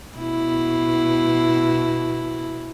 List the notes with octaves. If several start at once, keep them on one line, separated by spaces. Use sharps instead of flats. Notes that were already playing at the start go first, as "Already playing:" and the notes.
B2 E4